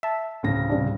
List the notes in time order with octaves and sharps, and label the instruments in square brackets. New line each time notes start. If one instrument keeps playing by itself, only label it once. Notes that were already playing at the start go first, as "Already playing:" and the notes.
[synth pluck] E5 A5
[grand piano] D1 C#3 A#6
[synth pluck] C3 G3 D4